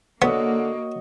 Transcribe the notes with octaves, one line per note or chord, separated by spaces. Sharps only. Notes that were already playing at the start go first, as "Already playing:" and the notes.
D3 A#3 B3 F#4 C#5 D#5